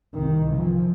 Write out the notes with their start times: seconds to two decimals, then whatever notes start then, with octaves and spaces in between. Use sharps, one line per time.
0.12 C2 D#3
0.51 E3 F3